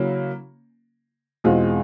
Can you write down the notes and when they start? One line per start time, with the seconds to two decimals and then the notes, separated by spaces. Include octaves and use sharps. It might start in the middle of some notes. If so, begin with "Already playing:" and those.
Already playing: C#3 F#3 A#3 C#4 E4
1.44 E2 B2 G#3 C4 F4